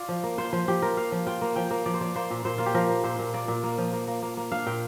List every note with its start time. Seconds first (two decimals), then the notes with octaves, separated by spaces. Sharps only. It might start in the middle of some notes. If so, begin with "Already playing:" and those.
Already playing: F4 D5 F5
0.09 F3
0.23 A#3
0.38 F4 C5
0.53 F3 C5
0.68 F3 G4
0.82 F4 A#4
0.97 A#3 F5
1.12 F3
1.27 F4 G5
1.42 A#3
1.56 F3 G5
1.71 A#3
1.86 F3 D5
1.94 C5
2.01 F3 D5
2.15 A#3 C5
2.31 A#2
2.45 A#2 C5
2.58 A#3 F4
2.66 G4
2.74 F3 A#4
2.89 A#3
3.04 A#2 C5
3.19 A#2
3.34 A#3 D5
3.48 A#2
3.64 A#3
3.78 F3
3.93 A#3
4.08 A#3
4.22 A#3
4.37 A#3
4.52 D4 F5
4.66 A#2 G5